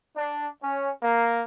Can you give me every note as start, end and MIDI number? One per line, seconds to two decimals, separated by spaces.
0.16 0.48 62
0.62 0.89 61
1.01 1.44 58